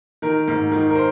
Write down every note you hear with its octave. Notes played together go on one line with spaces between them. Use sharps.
D#3 A#4
G#2
D#3
A#4
C5